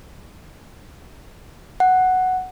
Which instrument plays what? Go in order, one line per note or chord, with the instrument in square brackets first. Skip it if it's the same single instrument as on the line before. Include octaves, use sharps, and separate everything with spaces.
[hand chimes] F#5